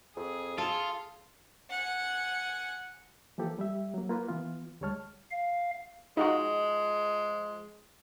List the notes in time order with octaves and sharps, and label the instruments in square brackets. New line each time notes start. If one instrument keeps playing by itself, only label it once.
[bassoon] F2 [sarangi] G#4
[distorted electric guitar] F4 [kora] A4
[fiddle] F#5 G#5
[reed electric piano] E3 F3 A#3 G4 A4
G3 G4 E5
F#3 A#3
A#3 F4 B4
E3 B3 F4
D2 G3 G#3 C#5 A5 F6
[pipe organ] F5
[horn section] F3 G#3 [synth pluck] D#4 F4 F#4